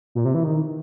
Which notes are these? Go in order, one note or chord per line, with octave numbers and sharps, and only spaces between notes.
A#2
C3
E3
D#3